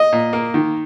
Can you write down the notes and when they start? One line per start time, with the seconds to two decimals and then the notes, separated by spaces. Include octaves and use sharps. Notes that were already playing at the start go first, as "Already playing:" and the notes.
Already playing: D#5
0.12 A#2
0.33 A#3
0.54 D#3